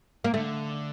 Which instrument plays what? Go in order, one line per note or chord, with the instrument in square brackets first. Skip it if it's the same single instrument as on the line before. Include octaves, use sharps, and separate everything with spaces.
[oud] A#3
[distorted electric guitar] D3 [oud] A3